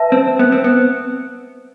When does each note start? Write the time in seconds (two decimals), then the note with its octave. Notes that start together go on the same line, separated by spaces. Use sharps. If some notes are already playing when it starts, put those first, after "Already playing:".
Already playing: B4 E5 A5
0.12 C4
0.39 B3
0.52 C4
0.64 B3